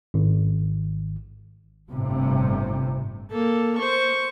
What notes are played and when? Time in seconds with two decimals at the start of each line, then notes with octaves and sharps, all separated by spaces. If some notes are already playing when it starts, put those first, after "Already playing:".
0.14 G#1
1.91 G1 A2 C3
3.31 A#3 A4
3.79 C5 C#6